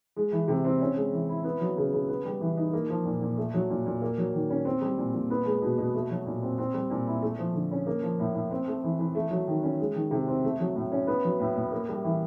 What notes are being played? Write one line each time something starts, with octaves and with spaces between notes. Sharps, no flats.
G#3
E3
C3
C4
C#4
G#3
E3
E4
B3
F#3
C#3
C#3
B3
G3
E3
D#4
A#3
F3
A#2
A#2
A3
F#3
A#2
A#2
A#3
F#3
D#3
C#4
C4
G3
A#2
A#2
B3
G#3
B2
B2
A3
F#3
A#2
C4
C4
G3
A#2
E4
A3
F3
D3
C#4
A#3
F3
A2
A2
C4
A3
E3
E3
A3
F#3
D#3
C#4
G#3
D#3
C3
C4
A3
F#3
A2
C#4
B3
F#3
A2
A2
A#3
G3
E3